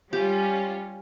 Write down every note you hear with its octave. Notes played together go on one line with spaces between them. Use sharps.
G3 C#4 F4 G4